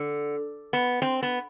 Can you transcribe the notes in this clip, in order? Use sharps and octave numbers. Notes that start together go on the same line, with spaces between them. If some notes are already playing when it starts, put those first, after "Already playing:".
Already playing: D3
B3
C4
B3